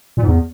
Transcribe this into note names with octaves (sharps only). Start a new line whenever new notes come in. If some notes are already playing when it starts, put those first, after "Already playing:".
A#2
G#2
E2